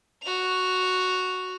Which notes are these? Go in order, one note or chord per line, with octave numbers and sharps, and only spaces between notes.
F#4 F7